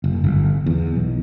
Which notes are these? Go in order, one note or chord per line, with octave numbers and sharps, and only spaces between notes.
F#1
G1
E2
B1